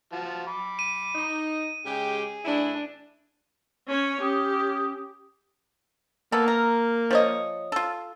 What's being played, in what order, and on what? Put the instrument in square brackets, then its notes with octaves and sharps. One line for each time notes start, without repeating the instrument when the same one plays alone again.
[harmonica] F3 F#4 A5
B5 D6
[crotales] D#7
[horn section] D#4
[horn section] C#3 G#3 G4 [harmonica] G#4
[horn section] A2 E3 E4 [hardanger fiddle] D4
[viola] C#4 C#5
[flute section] C#4 D#6 [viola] G4
[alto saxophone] A#3 [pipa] B3 A4
[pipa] A#4
F3 C#5 D#5
F4 A4